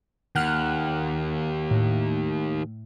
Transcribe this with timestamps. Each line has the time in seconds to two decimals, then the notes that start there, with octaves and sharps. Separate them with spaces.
0.35 D#2 F#5 F6 F#6
1.71 A2